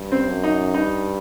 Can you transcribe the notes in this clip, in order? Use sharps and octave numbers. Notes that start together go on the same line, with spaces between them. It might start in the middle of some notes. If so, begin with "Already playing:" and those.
Already playing: G2
C4
F#2
D#4
G2 D#4